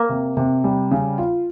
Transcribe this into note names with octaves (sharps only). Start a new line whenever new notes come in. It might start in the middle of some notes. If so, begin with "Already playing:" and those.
Already playing: A#3
C3
C3
G3
C#3
F4